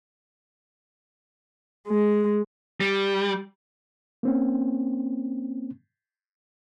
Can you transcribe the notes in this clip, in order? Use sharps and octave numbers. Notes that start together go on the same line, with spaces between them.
G#3
G3
A#3 C4 C#4